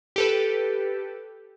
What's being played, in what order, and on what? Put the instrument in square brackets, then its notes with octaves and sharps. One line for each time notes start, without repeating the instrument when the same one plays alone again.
[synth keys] G4 A4 B4